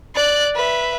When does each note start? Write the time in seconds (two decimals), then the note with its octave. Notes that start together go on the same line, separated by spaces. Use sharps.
0.15 D5 F#6
0.56 B4 E5